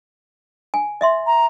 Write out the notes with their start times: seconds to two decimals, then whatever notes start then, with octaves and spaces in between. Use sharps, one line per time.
0.74 G#5
1.01 D#5 E5 C6
1.27 A#5